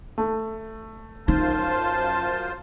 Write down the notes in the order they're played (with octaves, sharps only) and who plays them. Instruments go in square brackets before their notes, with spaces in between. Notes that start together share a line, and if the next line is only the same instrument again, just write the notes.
[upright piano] A3
[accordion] F#2 F4 C5 [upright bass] D#4 [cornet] A5